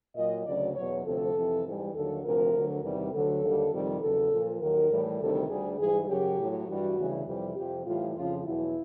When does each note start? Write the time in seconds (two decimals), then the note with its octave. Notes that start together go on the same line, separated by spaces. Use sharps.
0.16 A#2 F#3 D#5
0.45 D2 C#3 F#3 D5
0.75 E2 B2 F#3 C#5
1.05 D2 C3 F3 A4
1.35 F2 C3 E3
1.65 G#2 E3 G3
1.94 D#2 D3 F#3 A4
2.23 D2 C3 F3 A#4
2.53 D2 D3 F#3
2.83 E2 C3 D#3 G3
3.12 D2 D3 F#3 A4
3.41 D#2 D3 G3
3.71 F2 C3 D#3 G3
4.01 E2 C#3 F#3 A4
4.31 A#2 F3
4.61 D#2 D#3 F#3 A#4
4.89 A2 E3 G3
5.19 D2 C3 D#3 G3 A4
5.49 D2 D3 G3 G#4
5.78 G#2 E3 G3 G#4
6.08 F#2 C#3 F#3 G4
6.38 A2 F#3
6.68 G2 E3 G3 F#4
6.97 D2 C#3 E3 G3
7.26 F2 C3 E3 G3 G4
7.56 F2 C3 F3 G4
7.85 A2 E3 G3 F4
8.15 F2 C#3 F3 F4
8.45 E2 B2 F#3 E4